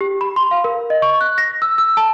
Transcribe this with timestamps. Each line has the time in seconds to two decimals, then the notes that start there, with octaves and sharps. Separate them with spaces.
0.01 G4
0.21 B5
0.36 C6
0.51 F5
0.64 A#4
0.90 D#5
1.02 C#6
1.21 F#6
1.38 A#6
1.62 E6
1.78 E6
1.97 A5